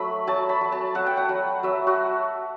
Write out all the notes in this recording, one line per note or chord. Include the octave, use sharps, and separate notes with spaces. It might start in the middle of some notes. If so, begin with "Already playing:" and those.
Already playing: F#3 A3 B5
F#3 A5
B5
F#3
A5
F#3 F#5
G5
F#5
F#3
F#3 E5
F#4